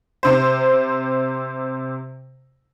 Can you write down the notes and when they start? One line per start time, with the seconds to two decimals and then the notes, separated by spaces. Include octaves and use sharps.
0.23 C3 C5